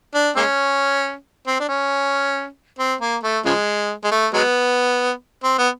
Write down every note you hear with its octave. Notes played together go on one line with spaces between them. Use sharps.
D4
G#3 A#3 C#4
C4
D4
C#4
C4
A#3
A3
C#3 F3 G#3
G#3
A3
F#3 G#3 B3
C4
B3